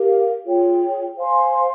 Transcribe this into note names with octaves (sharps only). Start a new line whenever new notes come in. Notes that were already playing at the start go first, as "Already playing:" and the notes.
Already playing: G4 A#4 F5
F4 G#4 C#5 G5
C5 F5 G#5 C6